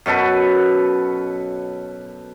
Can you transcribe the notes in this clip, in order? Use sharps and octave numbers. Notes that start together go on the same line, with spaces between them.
F#2 B2 A4 B4